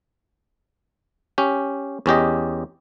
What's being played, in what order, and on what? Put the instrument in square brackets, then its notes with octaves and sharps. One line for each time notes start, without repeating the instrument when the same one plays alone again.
[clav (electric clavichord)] C#4 G4
E2 C#4 G4 D#5